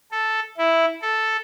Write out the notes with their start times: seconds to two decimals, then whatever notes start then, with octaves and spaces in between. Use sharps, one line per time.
0.11 A4
0.58 E4
1.02 A4